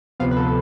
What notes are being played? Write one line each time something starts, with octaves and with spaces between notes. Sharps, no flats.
D2 C3 F3 B3 F5
B4
A4